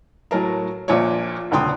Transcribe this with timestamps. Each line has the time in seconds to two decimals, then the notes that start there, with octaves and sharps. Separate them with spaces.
0.31 A2 F#3 A#4 A5
0.88 A#1 A#2 D4 F4 C#5
1.51 D#1 C#2 D3 G5 C6 D#6